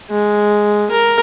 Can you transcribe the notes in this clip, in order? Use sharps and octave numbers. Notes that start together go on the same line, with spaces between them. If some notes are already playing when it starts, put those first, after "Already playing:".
G#3
A#4